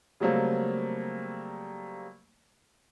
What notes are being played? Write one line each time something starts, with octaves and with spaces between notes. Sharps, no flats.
C#3 F#3 G3 A3 A#3 C4